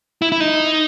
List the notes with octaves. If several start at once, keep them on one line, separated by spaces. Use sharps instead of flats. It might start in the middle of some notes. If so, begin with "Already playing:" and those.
E4
E4
D#4